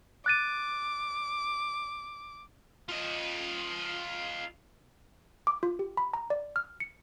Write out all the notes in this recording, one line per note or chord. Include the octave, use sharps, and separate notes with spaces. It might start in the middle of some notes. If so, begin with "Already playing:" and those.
D6 F#6 A6 D#7
F4 D#5
D6
F4
G4
B5
A#5
D5
F6
C#7